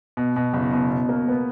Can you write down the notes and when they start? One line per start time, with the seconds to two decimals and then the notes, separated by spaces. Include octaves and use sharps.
0.17 B2
0.36 B2
0.54 F#1
0.73 B2
0.91 B2
1.09 A#3
1.29 B3